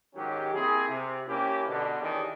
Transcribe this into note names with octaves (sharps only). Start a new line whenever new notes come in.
G#2 D#3 F#3 C#4 G4
A#3 C4 E4 G#4
C3
A#3 C#4 E4 G4
B2 D3
D#3 E3 C#4 D4 G4 G#4